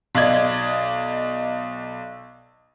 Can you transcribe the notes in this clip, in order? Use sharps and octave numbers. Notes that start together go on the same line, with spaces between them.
B1 D5 D#5 G#6